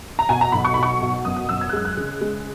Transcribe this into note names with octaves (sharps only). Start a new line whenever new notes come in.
A#5
B2 G#5
A#5
B1 B5
C#6
B2 B5
C#6
B2
F#2 D#6
D#6
F#2 E6
G#6
F#6
G#3 E6
F#6
C#3
G#3